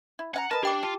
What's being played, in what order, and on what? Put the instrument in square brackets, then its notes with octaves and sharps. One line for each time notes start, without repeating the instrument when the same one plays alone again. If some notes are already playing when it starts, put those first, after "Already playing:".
[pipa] E4
[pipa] C#4 F5 A#5 [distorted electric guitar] F#5
[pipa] A#4 B4 D#5 [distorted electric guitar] A5
[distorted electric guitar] D4 [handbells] G4 G5 D6
[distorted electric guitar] F4 [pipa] A5